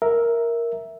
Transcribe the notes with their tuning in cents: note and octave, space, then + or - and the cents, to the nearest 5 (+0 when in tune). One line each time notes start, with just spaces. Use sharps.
A#4 +5 E5 -5